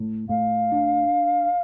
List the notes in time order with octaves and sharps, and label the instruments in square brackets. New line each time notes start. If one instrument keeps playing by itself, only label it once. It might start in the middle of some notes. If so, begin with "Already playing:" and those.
Already playing: [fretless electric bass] A2
[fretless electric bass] A2 [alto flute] F5
[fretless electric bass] D4